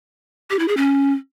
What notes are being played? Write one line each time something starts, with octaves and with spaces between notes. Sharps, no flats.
G4
E4
G#4
C#4